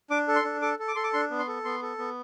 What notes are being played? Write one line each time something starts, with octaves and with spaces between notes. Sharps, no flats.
D4 D6
A4
C6
D4
A4 D6
A4
D6
A4 C6
D6
D4 C6
B3
C6
A4
B3 C6
A4
B3